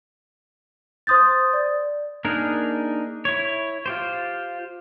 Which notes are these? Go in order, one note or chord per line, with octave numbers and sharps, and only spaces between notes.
C5 C6 D#6 G6 A6
D5
A#3 D4 D#4 G#4 A#4
E4 C#5
F4 G4 C5